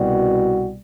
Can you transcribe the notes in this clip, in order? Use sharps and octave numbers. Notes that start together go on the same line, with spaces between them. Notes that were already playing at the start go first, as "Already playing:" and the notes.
Already playing: C2 B2 G3 F#4